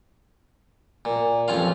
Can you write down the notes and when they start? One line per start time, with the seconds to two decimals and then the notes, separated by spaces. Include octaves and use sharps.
1.05 A#2
1.48 A1 F2 C#4 F4 F5